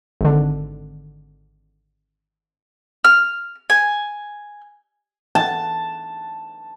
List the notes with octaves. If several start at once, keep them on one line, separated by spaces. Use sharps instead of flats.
G#1 D3
F6
G#5
A5